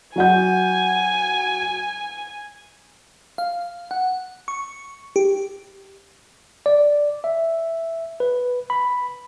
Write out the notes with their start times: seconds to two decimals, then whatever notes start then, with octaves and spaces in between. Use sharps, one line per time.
0.16 F#3 F#5 G#5 G6
3.38 F5
3.91 F#5
4.48 C#6
5.16 G4
6.66 D5
7.24 E5
8.20 B4
8.70 B5